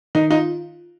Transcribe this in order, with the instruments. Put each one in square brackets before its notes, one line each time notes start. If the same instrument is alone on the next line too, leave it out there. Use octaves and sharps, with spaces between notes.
[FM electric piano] D#3 [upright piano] D#4
[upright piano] D#4 [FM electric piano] F4